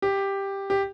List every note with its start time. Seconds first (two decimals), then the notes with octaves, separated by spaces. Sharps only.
0.02 G4
0.70 G4